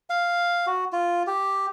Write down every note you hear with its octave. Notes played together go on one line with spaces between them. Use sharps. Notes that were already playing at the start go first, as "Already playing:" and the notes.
F5
F#4
F4
G4